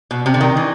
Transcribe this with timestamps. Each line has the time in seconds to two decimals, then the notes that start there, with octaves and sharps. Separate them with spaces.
0.11 B2
0.26 C3
0.34 D3
0.41 D#3
0.57 E3